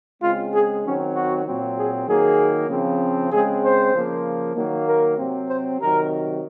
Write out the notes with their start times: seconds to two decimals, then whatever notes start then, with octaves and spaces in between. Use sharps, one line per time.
0.21 C#3 G#3 C4 F4
0.52 G#4
0.83 D#3 F#3 C4 C#4
1.14 F#4
1.45 A#2 F#3 C4
1.77 G#4
2.07 D#3 F#3 A#3 G#4
2.70 C#3 F3 C4
3.31 C#3 G#3 C4 G#4
3.63 C5
3.94 C#3 F3 A#3
4.55 D#3 F#3 A#3
4.87 A#4
5.18 C3 F#3 C4
5.49 C5
5.80 C3 D#3 F#3 A#4